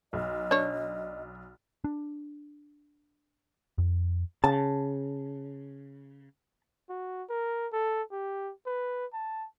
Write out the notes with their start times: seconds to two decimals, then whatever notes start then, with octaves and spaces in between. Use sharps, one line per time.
0.13 B1 D#5
0.51 D4 C#5 D5
1.84 D4
3.78 F2
4.44 C#3 A5
6.90 F#4
7.29 A#4
7.73 A4
8.12 G4
8.66 B4
9.14 A5